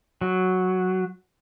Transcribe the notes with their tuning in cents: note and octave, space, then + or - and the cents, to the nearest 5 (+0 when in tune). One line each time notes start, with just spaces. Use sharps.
F#3 +0